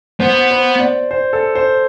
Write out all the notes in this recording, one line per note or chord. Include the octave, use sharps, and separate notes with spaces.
B3 C5
C5
D5
C5
A4
C5